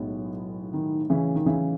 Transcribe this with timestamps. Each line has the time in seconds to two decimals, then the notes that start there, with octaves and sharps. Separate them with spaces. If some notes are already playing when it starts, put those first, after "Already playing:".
Already playing: B1 A2 G#3 B3
0.74 D#3
1.10 C#3 E3
1.35 D#3
1.46 C#3 E3